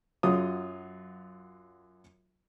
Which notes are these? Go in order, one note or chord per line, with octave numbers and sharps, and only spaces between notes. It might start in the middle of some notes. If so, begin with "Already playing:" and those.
F#2 F#3 F4 D#6